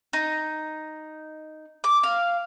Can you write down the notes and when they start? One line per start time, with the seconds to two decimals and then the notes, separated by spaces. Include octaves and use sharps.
0.13 D#4
1.84 D6
2.03 F5